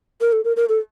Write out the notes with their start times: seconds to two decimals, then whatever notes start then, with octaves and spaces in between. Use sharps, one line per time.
0.21 A#4
0.33 A4
0.45 A#4
0.57 A#4
0.69 A4